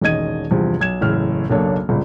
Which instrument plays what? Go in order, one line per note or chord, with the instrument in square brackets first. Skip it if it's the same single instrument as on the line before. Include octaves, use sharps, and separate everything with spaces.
[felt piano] E1 A1 D#3 D#5 G#6 D#7
E2 G2 C3 F3
B1 G#6 E7
F#1 E2 A2 F6
F#1 B1 A#3 D4 A4 C#5
G1 C#2